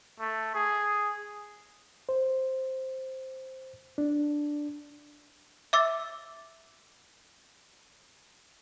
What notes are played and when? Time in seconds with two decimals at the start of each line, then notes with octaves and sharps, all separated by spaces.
0.20 A3
0.54 G#4
2.09 C5
3.98 D4
5.73 E5 D6 E6 A6